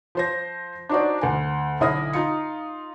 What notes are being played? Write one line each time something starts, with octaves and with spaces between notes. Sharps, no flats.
F3 C5 A#6
D4 D#4 F#4 C5 D5
D2 G#5
B1 D3 E4 D#6 F6 A#6
D#4 F4 C#7